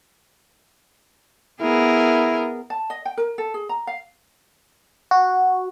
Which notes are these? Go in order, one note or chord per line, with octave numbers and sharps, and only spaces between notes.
B3 E4 G#4 A#4
A5
D#5
G5
A#4
A4
G#4
A#5
F5
F#4